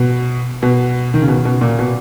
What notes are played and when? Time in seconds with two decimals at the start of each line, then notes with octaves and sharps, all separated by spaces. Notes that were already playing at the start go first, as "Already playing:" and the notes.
Already playing: B2
0.62 B2
1.14 D#3
1.22 C#3
1.28 B2
1.45 B2
1.61 A#2
1.79 B2